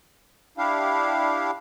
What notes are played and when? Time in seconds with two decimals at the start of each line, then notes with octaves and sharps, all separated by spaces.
0.58 D4 E4 G4 F5